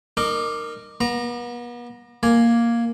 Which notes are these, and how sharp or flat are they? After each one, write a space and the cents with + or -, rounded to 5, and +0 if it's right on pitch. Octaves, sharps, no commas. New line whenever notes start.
D#4 -30 A#4 -10 D6 +0
B3 -40 A#5 +0
A#3 +0 G#5 +0